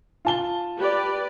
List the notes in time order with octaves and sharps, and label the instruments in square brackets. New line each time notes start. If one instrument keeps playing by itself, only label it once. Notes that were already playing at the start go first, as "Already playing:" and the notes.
[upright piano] F4 A5 G7
[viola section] G4 B4 D5